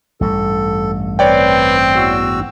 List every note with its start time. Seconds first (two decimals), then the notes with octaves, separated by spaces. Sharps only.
0.21 A1 G2 G3 A4
1.19 C4 B4 C#5 D5 G5
1.96 E2 F#4 E6